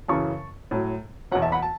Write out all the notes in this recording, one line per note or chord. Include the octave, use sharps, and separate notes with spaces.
F#2 C#3 E3 A5 C#6
A2 F#3
E2 B2 F#3 C#5 F#5
E5 A5
F#5 B5
A5